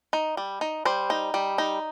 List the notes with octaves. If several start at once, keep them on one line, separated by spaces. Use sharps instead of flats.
D#4
G3
D#4
G3 C5
D#4
G3
D#4